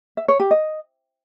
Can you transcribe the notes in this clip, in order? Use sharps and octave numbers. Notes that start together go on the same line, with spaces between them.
E5
C#5
G4
D#5